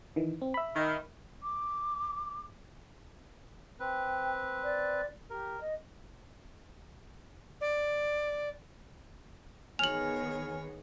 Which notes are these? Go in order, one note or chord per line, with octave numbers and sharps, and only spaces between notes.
D#3 E3
C4
E5 B5
D#3
D6
C4 B4 G5
D5
G4 A#4
D#5
D5
D#3 B3 G#4 C#5 G#5 F6 F7 F#7